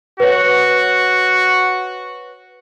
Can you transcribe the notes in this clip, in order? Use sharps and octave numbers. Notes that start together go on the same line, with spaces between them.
F#4 B4 C#5